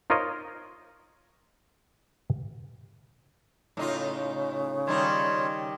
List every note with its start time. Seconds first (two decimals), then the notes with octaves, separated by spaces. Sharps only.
0.10 D#4 F4 A#4 C5 C#5 D#5
3.77 A2 C#3 D#4 F4
4.87 D#3 G3 D#4 F4 C#5